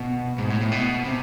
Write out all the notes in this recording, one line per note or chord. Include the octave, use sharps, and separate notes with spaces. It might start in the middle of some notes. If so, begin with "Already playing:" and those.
Already playing: B2
G#2
A2
A2
B2
C3